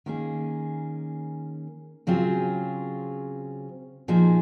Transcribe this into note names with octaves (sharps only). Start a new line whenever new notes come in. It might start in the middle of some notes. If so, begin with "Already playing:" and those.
D#3 A#3 C#4 G#4
C#3 F#3 C4 F4 G#4
A#2 F3 A#3 D#4 G#4